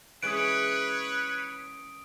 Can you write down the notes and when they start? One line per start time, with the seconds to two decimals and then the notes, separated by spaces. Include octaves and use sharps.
0.23 E3 G#3 C#4 B4 C#5 D#6 F#6 D7